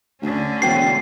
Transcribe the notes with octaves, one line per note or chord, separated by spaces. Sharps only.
D2 D3 C#4
E1 F#4 C5 G5 C7